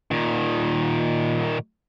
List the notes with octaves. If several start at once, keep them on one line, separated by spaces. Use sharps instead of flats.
A#2 D#3